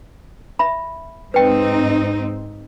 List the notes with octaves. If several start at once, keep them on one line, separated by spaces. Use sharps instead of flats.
E5 B5
G#2 C4 D#4 B4 G5